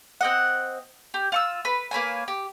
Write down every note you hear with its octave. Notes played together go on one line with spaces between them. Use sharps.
C4 D#5 F#5
G4
F4 C#6 E6
B4
A#3 B4 C#5 G#5
G4